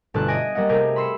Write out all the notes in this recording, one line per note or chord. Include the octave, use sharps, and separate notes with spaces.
G1 B2 D3 A3 A5 F#6
D#5 G#5 D#6 A#6 D7 D#7
G3 A#3 D#5 F#5
C3 A3 G4 G#4 A#4
B5 C6 E6 C7 C#7